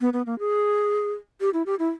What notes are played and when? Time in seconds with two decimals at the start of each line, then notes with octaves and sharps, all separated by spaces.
0.01 B3
0.13 B3
0.26 A#3
0.39 G#4
1.41 G4
1.54 E4
1.66 G4
1.79 E4